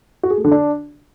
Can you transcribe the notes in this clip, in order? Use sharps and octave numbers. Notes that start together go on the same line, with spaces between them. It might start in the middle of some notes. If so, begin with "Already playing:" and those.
F#4
G#4
A3
D3
D4